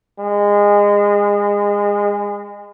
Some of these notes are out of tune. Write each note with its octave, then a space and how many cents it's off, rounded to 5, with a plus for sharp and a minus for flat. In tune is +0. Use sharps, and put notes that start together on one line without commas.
G#3 -25